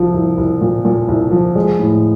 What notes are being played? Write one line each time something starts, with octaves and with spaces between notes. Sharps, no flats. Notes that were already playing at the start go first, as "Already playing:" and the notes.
Already playing: C2 F3
C2
C2
A#2
A#2
C2
F3
G#3
A2